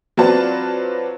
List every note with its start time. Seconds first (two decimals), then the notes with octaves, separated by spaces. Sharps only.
0.17 F#3 C4 F4 B4 D5 A5